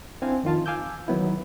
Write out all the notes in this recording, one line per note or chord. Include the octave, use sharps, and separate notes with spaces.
C4 D4 E4 F5 G#5
F2 D#3 F4 A5
F5 G#5 D6 E6 G6
D#3 F#3 B3 E4